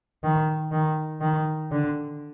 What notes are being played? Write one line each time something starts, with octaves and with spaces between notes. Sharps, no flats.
D#3
D#3
D#3
D3